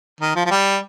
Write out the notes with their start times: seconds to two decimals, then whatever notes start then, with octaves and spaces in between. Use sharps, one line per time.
0.21 D#3
0.36 F3
0.46 F3
0.51 G3